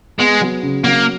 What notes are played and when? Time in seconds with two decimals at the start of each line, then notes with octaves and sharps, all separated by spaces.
0.19 G#3 B3
0.41 F#3
0.63 C#3
0.85 F#3 A#3